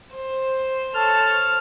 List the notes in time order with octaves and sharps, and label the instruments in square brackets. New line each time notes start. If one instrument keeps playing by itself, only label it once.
[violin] C5
[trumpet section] A4 C#5 A5 [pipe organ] F6